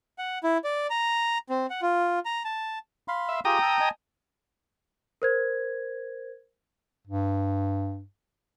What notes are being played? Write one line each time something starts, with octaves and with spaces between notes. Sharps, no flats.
F#5
E4
D5
A#5
C4
F#5
F4
A#5
A5
F5 B5 C6
E5
F4 G4 G#4 G5 A#5 D#6
A5 E6
D#5 G#5 A5
A#4 C5 G#6
G2